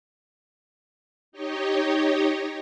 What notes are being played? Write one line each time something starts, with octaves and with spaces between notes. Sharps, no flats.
D#4 G4 C#5 D#5